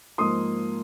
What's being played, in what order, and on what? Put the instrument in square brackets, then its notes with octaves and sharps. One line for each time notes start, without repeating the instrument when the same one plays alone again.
[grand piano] G#2 F3 A#3 C6 D#6